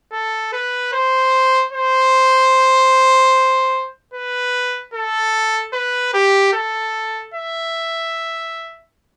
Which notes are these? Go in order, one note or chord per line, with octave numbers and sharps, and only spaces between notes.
A4
B4
C5
C5
B4
A4
B4
G4
A4
E5